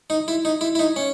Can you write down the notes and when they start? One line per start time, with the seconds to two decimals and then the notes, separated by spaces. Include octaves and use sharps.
0.10 D#4
0.28 E4
0.45 D#4
0.61 E4
0.75 E4
0.79 D#4
0.96 C#4